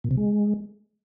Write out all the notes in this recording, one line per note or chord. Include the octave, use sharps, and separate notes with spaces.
A#2
C3
G#3